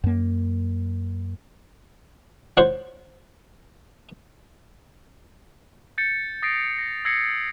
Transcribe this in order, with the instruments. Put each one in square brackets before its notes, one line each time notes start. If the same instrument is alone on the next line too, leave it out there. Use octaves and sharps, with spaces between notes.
[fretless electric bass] F#2 A#3
[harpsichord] C5 C#5 F#5
[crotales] G6 A6 C#7
D#6 A6 A#6 C7 D7
A#6
E6 G#6 A#6 C7 C#7